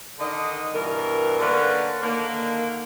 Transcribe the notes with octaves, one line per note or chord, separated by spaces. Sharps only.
D3 D#3 D#5
G2 B2 E3 A#4
D3 A#3 C#4 A#4 B4
D3 D#3 A#3